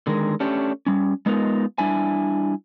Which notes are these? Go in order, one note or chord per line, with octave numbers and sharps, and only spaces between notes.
D3 D#3 G#3 A#4
A3 C#4 D4 G4
G3 C#4
G#3 B3 D#4 F4 A#4
G3 D4 E4 E5 G#5